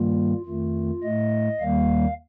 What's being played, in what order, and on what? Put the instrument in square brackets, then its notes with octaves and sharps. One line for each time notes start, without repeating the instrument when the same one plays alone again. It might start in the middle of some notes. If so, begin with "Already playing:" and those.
Already playing: [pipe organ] G2 D#3 G3 A#3 F4
F2 D#3 A3 F4
A2 A3 D#5
D#2 D#3 G3 A#3 F5